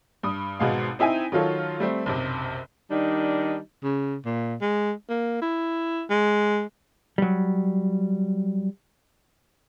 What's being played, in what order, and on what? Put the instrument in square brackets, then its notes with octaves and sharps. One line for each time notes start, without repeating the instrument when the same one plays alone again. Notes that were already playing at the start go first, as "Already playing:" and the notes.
[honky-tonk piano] G2 D#6
G#1 B2 G#3 F5
C4 D#4 E4 G5 G#5
D#3 F#3 F4 A4 C#5
G3 A3 C4
F#1 B1 C3
[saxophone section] D#3 G3 D4 D#4
[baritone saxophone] C#3
A#2
G#3
A#3
E4
G#3
[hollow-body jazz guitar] F#3 G3